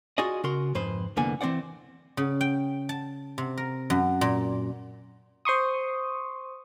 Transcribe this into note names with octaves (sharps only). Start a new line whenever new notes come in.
F4 F#4 G#4 D5 D#5
C#3 F#4 A#4 C6
F2 G#2 B4 C5
C2 F2 D3 A#3 B3 G#5
E3 C4 C5 D5 F#5
C#3
G5
A5
C3
A#4
F#2
A#2
C5 C6 C#6 D#6